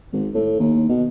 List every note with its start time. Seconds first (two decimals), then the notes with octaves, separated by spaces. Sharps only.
0.13 G#1
0.34 A2
0.60 D#2
0.89 B2